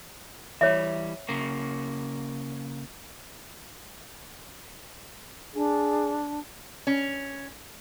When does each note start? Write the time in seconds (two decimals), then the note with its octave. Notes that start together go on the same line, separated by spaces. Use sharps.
0.61 E3 G3 C#5 E5
1.29 C#3 A#3
5.55 D4 G#4
6.87 C#4